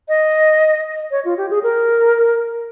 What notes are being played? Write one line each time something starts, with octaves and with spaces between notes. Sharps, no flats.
D#5
C#5
F4
G4
G#4
A#4